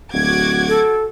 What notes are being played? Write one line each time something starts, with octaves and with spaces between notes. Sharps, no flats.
D1 F#4 D6 G#6
A4